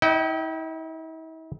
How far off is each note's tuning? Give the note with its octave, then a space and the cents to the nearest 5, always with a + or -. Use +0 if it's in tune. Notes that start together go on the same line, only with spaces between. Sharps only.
E4 -45 D#5 +0 G5 -25